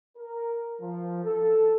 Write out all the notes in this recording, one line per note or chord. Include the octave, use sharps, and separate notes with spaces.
A#4
F3
A4